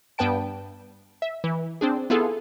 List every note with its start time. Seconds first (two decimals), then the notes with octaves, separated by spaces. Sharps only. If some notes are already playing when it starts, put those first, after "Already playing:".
0.18 G2 B3 B4 G5 A5 D7
1.22 E5
1.44 E3
1.81 C4 D4 G#4
2.10 B3 E4 F4 G#4 A4